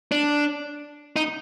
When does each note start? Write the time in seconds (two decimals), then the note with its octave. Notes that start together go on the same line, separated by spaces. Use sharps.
0.12 D4
1.16 D#4